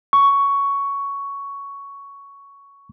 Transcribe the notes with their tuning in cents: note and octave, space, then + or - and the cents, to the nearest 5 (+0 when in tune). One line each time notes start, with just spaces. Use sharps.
C#6 +10